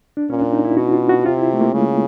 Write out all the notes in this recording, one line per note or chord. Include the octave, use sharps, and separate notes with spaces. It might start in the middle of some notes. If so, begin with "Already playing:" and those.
D4
A#2 C#4
D4
D#4
E4
B2 F#4
F4
F#4
C3 F4
E4
A3
A#3
C#3 G#3